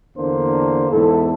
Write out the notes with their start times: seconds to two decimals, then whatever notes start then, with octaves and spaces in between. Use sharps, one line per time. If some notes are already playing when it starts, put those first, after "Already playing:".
0.16 E2 D3 A#3 D4 C5
0.91 E2 G#2 E4 A4